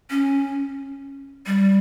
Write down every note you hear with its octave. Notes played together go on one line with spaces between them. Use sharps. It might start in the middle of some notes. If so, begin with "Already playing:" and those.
C#4
G3